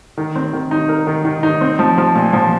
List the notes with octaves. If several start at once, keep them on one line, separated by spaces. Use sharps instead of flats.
D#3
C4
D#3
D#4
A#4
D#3
D#3
D#4
C4
F3
F3
A#2
F3